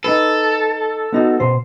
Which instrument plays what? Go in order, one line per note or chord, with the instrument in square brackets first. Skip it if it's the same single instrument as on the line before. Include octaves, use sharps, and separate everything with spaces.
[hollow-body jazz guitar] D#4 B4 [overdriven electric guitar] A4
[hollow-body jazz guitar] B3 D#4 F#4
B2 C5